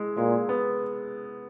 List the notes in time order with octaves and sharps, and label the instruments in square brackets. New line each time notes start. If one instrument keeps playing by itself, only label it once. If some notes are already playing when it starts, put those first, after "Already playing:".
Already playing: [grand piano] G#3 E4
[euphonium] A#2 [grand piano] G#3
[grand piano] B3